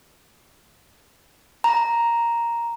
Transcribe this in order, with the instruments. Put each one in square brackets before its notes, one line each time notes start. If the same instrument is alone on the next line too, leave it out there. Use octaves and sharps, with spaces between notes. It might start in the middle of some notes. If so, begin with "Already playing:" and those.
[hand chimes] A#5